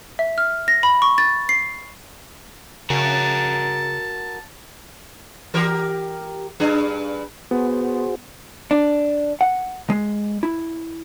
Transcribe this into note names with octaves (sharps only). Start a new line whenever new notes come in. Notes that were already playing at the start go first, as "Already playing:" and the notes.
E5
F6
A#6
B5
C#6
A6
C7
C#3 F#4 A#4 A5
E3 G4 A#4
G2 D4 G#4
B3 F#4 G#4 C5
D4
F#5
G#3
E4